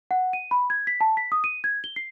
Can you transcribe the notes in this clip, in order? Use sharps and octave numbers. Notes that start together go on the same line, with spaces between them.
F#5
D#7
B5
G#6
B6
A5
B6
D#6
D#7
G#6
G7
C7